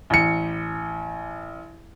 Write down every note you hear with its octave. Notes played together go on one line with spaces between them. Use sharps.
A1 C#7